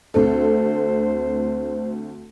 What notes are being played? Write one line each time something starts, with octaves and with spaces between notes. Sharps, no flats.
D2 C4 A4 C5